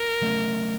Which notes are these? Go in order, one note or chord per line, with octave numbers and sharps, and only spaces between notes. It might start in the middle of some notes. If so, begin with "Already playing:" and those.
Already playing: A#4
C#3 F#3 A3 C#4